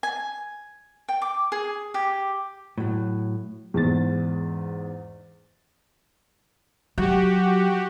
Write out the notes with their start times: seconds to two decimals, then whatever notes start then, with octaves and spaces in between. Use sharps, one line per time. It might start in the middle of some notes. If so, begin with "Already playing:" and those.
0.03 G#5
1.09 G5
1.22 D6
1.52 G#4
1.94 G4
2.78 A2 F#3
3.74 E2 G#2 A6
6.98 F#3 F#4 G4